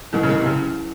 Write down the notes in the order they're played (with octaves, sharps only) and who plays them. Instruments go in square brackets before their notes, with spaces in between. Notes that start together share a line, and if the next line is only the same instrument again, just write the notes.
[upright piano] D#3 [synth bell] F#3 C#4 E4
[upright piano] C#3
D#3
C3
C#3